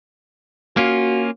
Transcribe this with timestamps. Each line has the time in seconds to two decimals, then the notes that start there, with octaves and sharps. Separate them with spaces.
0.77 A#3 C#4 F4 F#4